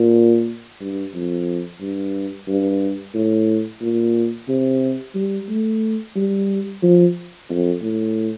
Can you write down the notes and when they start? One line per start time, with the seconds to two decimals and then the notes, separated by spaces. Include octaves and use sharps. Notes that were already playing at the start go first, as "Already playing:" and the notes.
Already playing: A#2
0.80 G2
1.14 F2
1.81 G2
2.48 G2
3.14 A2
3.81 A#2
4.48 C3
5.15 G3
5.49 A3
6.16 G3
6.82 F3
7.49 F2
7.82 A2